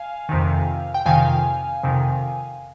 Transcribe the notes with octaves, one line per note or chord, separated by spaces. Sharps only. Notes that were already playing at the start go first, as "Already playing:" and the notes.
Already playing: F5 G#5
F2 C3 D#3
G5
F2 C3 D#3 F5 G#5
F2 C3 D#3